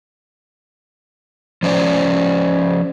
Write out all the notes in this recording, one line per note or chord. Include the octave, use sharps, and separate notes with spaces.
F3 C#4 C5 D5